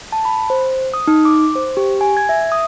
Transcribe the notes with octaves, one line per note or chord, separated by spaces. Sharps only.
A5
B5
C5
D#6
D#4
D6
C5
G4
G#5
G#6
E5
D#6